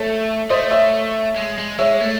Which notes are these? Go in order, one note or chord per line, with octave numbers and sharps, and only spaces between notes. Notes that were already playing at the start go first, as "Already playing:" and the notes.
Already playing: A3 A4 C#5
A3 C5 D#5
C#5 E5
G#3
G#3
G#3 C#5 E5
A3